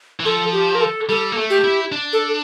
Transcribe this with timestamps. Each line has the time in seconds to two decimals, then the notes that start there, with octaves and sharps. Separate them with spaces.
0.20 E3
0.25 F3 A4
0.53 G4
0.75 A#4
0.81 A4
1.09 G3 A4
1.32 A#3
1.37 A3
1.50 G4
1.64 E4
1.92 D4
2.13 A4